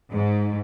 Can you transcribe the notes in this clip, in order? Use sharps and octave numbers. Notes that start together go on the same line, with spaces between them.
G#2